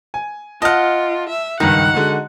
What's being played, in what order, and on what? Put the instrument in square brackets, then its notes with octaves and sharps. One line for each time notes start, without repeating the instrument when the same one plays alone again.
[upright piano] G#5
[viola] F4 [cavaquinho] D#5 F#5 [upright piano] A5 F6
[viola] E5
[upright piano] C#2 G2 D#3 [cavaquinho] D#4 [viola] F#5
[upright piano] D3 G#3 F#4